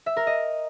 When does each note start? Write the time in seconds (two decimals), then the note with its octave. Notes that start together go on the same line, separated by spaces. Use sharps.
0.06 E5
0.17 A#4
0.27 D#5